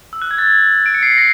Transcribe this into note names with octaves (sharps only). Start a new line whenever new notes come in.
E6
F#6
G#6
A6
D7
C#7
C7
B6
A#6